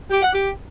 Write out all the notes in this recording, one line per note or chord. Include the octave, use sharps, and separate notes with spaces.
G4
F#5
G4